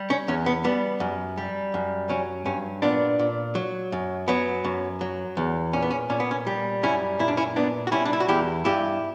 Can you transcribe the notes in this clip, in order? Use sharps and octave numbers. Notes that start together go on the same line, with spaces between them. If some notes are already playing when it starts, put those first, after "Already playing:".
Already playing: G3
C#4
E2 C#4
B3
G3 B3
F#2
G3
F#2
F#3 C#4
G2 C#4
A#2 B3 D4
A#2
F#3
F#2
F#3 B3
F#2
F#3
E2
A#2 C#4
B3
C#4
A#2 C#4
B3
C#4
G3
F#2 C#4 E4
A#2 E4
D4
C#4 E4
A#2 B3 D4
F#4
G3 C#4 E4
D4
E4
F#4
E2 E4 G4
G2 E4 G4